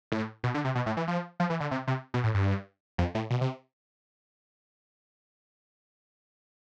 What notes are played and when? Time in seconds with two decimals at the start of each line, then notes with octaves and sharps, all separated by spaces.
0.12 A2
0.44 B2
0.54 D3
0.65 C3
0.75 B2
0.86 A2
0.97 E3
1.08 F3
1.40 F3
1.50 E3
1.60 D3
1.71 C3
1.87 C3
2.14 B2
2.24 A2
2.34 G2
2.98 F2
3.15 A2
3.30 B2
3.41 C3